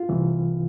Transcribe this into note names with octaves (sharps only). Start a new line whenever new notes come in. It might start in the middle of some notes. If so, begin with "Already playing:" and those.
Already playing: F4
C2 C3 E3